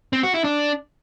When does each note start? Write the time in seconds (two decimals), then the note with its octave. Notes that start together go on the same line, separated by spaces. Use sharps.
0.13 C4
0.23 F#4
0.34 E4
0.44 D4